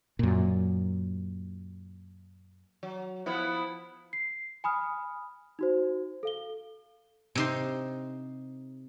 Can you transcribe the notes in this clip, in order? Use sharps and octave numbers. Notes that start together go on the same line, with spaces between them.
F#2 A#2
F#3
F3 B3 E4
C7
G#5 B5 D#6 F6
D#4 F#4 C5
A4 F5 G7
C3 D#4 C6